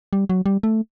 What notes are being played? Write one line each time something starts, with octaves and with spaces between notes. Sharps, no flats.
G3
F#3
G3
A3